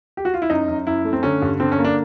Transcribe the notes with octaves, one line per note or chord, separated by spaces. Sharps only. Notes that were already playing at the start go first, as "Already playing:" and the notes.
G4
F#4
F4
E4
F#2 D#4
F#2
F#2 E4
A3
C4
D3 C#4
G2
D3 C4
C#4
A#3
D4